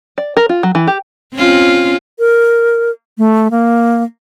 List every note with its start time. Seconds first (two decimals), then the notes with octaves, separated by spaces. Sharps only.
0.18 D5
0.37 A#4
0.49 F4
0.63 F#3
0.75 E3
0.87 G4
1.34 C4 C#4 F4
2.19 A#4
3.18 A3
3.51 A#3